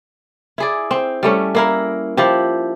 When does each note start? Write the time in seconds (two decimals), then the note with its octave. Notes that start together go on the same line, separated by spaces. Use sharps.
0.58 E4 G#4 D5
0.91 C4
1.23 G3 A3 C#4
1.55 A#3 E4 A#4
2.17 F3 E4 G4